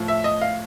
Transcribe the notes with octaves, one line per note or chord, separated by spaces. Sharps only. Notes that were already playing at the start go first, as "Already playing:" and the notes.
Already playing: A2 F3
E5
D#5
F5